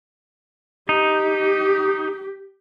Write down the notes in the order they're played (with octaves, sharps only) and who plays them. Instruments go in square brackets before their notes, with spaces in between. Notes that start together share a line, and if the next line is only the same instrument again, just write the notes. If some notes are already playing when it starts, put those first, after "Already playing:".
[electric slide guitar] D#4 [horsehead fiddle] G4